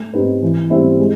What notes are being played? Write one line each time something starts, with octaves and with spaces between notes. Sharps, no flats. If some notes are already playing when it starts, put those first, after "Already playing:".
Already playing: A3
C4 D#4 G4 B4
E3
G3 C4 E4
G#3